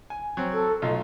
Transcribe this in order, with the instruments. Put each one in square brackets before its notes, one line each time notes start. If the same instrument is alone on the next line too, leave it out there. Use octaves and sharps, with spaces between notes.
[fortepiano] G#5
F#3 C4
[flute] A4
[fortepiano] B1 A3 F4 [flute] D#5